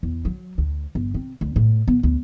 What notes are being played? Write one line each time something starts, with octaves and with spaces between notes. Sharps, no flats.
E2
F#3
D2
G1
C3
D2
A2
B3
D2